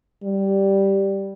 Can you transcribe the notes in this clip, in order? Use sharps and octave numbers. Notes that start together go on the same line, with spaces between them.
G3